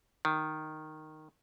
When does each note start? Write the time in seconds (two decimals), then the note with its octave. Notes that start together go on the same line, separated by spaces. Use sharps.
0.25 D#3